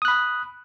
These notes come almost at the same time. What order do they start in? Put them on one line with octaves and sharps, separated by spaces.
D#6 F#6 B5